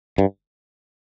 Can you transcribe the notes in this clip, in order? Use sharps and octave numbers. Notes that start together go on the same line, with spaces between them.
G2